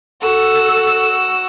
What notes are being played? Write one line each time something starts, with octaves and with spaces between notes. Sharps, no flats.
F#4 A4 E6